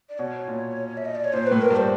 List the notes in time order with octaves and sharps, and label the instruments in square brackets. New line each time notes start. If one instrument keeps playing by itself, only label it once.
[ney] D5
[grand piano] B2 [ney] C#5
[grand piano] A#2
[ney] E5
D#5
D5
C#5
[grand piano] A#2 [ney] C5
[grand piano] A2 [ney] B4
[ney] A#4
[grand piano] G2
[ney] C5